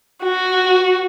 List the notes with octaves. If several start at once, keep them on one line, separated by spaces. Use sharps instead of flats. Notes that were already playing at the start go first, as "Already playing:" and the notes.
F#4